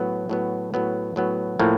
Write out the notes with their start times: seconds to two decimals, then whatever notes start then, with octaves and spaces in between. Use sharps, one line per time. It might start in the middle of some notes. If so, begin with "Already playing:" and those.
Already playing: A2 F#3 B3
0.29 A2 F#3 B3
0.74 A2 F#3 B3
1.16 A2 F#3 B3
1.59 A2 F3 A#3